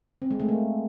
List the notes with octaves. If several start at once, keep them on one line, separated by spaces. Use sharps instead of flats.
C4
G#3
A3
A#3